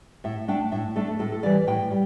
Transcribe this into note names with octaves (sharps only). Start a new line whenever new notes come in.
A2 E5
A3 D4 G5
A2 E5
A3 D4 A4
A2 A4
A4
E3 G3 D5
A2 G5
G3